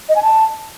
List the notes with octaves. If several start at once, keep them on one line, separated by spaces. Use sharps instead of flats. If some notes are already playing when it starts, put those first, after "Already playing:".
D#5
G#5
A5